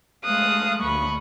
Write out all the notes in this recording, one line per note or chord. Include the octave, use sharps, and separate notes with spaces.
G#3 A3 F5 D#6 F#6
D2 B5 C#6